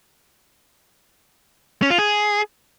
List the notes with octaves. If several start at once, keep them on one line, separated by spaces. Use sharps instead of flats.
C#4
F4
G#4